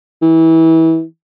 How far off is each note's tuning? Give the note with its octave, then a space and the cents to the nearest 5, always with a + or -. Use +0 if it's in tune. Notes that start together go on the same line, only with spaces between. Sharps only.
E3 -25